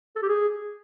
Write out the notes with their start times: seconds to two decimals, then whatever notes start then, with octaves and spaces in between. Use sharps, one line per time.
0.16 A4
0.22 G4
0.29 G#4